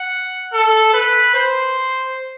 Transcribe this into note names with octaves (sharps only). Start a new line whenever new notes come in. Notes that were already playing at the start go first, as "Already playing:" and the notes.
Already playing: F#5
A4
B4
C5